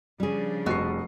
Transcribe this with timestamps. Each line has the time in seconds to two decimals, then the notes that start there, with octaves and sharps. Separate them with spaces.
0.20 C#3 F3 G3 D4 G#4
0.66 F1 B2 F#4 D#5 C7